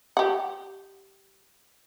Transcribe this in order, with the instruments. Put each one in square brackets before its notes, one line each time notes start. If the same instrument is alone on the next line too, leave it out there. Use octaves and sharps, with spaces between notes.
[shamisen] G4 F#5